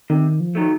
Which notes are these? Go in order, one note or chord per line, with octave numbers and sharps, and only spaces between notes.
C3 D#3
F3
D#3 F#3 A3